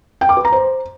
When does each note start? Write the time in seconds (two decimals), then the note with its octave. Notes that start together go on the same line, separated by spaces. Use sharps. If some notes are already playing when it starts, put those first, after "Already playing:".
0.21 G5
0.29 D6
0.37 B4
0.45 A#5
0.52 C5